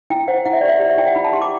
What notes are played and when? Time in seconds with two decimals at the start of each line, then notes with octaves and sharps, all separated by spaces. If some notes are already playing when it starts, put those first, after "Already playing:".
0.10 E4 G5
0.28 C5 F#5
0.45 E4 F#5
0.53 E5
0.61 G4 D5
0.69 E5
0.80 G4 D5
0.89 E5
0.98 E4 G5
1.06 F#5
1.15 E4 B5
1.24 A5
1.33 G4 C6
1.42 D6